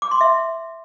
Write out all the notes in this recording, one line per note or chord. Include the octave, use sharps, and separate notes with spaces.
D6
C6
E5